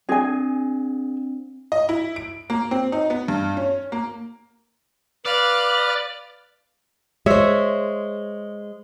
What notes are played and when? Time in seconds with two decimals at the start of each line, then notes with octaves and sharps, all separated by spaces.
0.09 C4 D4 G#4 G#5
1.72 D#5
1.89 E4
2.16 D7
2.50 A#3
2.71 C4
2.92 D#4
3.10 B3
3.28 G2
3.57 C#4
3.92 A#3
5.25 B4 D5 F5 F6 F#6
7.26 G#3 C5 C#5 E5